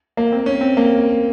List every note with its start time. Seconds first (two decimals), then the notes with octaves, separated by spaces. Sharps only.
0.17 A#3
0.32 C4
0.46 C#4
0.61 C4
0.77 A#3